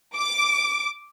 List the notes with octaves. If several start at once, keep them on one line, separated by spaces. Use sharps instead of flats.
D6